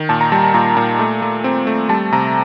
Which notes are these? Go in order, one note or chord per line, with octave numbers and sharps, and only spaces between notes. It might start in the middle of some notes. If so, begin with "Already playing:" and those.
Already playing: D#3
A#2 A5
A#5
G3 A5
A5
A#2 A#5
A#2 A#5
A3
A3
C4
A3
G3 A5
C3 A#5